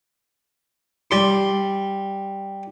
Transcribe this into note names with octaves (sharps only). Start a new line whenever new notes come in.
G3 C6